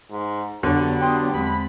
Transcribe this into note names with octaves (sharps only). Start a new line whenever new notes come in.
G#2
F2 D3 F#3 B3 D4 G4 C#5
G5 C6 D#6
E2 G#3 C4 B5